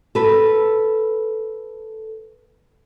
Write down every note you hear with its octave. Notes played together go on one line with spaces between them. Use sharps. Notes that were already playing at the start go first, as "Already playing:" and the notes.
A4 B4